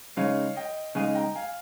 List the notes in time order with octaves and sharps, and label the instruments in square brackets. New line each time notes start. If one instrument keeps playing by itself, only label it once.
[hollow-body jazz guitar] C#3 G#3 D#4 [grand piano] C#5 F5
[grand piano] D#5 G5
[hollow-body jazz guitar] C#3 G#3 D#4 [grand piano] F5 G#5
[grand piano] G5 A#5
F5 G#5